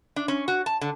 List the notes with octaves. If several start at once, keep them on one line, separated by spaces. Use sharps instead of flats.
D4
C#4
F#4
A5
D3